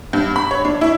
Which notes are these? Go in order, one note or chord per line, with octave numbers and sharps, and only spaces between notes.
G2
B5
C#5
D4
E4